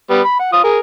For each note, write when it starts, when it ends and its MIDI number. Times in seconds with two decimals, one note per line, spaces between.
0.10 0.20 55
0.10 0.20 59
0.25 0.35 83
0.40 0.48 78
0.53 0.60 65
0.53 0.60 87
0.64 0.79 68
0.64 0.79 70